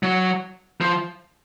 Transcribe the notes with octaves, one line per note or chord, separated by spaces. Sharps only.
F#3
F3